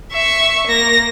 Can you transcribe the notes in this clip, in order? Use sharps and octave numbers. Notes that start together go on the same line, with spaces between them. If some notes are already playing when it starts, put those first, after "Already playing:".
E5 C#6
A#3 A#6